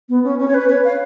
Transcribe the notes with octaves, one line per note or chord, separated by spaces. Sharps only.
B3
C#4
C#4
C#5
B4
C#5
F5